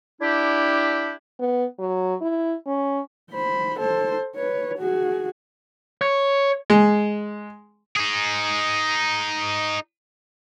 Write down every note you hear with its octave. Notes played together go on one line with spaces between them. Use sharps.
D4 E4 G4
B3
F#3
E4
C#4
C5 B5
A4 C5
B4 C#5
F#4 G#4
C#5
G#3
D#4 G#4